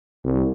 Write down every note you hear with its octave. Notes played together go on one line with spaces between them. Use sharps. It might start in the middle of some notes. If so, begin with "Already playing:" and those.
C2